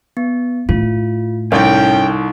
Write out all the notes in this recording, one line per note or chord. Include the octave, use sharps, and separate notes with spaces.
B3
A2 F4
C2 C#4 D#4 E4 A4 G5